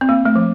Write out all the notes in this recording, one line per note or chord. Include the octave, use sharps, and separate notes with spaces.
C4
A#3
A3
F3